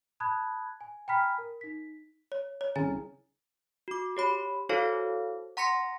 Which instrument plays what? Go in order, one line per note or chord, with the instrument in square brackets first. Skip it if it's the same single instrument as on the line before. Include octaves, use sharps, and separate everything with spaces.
[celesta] A5 B5 D#6 F#6 G#6
G#5
G5 G#5 A#5 B5 F6 B6
A#4
D#4 B6
[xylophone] C#5
C#5
[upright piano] C2 C#3 [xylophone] G#5 A#5 A6
[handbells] F#4 D6
G4 C#5 B5
E4 F#4 A4 C5 C#5 F5
F#5 A#5 C6 A#6 B6 C#7